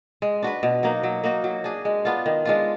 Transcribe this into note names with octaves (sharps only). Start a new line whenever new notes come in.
G#3
D4 F#4 B4
B2
F#3 A#3 D#4
F#3
A#3 D#4 F#4
F#3
D4 G#4
G#3
B3 D4 F4
D#3
G#3 D4 F4